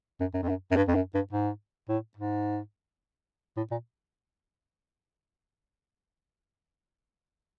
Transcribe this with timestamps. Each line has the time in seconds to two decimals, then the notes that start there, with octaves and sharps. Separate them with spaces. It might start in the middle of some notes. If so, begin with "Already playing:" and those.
0.20 F#2
0.34 F#2
0.43 F2
0.49 F#2
0.71 F#2
0.77 G2
0.88 F2
0.95 F#2
1.14 G2
1.32 G#2
1.89 A2
2.17 G#2
3.57 A2
3.71 A#2